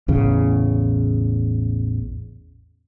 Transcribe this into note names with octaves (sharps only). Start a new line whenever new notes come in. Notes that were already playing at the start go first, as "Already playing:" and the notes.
A1 E2 C#3